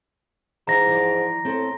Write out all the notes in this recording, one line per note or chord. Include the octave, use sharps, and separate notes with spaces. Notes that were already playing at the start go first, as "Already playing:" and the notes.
G#2 E3 A#5 A#6
E3 F3 D5
A2 C4 A4